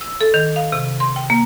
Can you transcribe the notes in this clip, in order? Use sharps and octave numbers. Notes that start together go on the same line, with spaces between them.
E6
A4
D#3
F5
C3
C6
G5
A#3